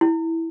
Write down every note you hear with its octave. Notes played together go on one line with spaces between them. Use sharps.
E4